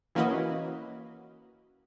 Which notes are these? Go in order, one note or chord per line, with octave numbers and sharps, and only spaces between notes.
E3 A#3 C#4 F#4 B4 D#5